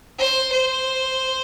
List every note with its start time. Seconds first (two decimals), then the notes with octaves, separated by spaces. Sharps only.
0.19 C5
0.53 C5